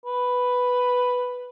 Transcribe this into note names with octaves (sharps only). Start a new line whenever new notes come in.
B4